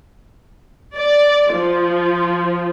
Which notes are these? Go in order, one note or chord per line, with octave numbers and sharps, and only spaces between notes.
D5
F3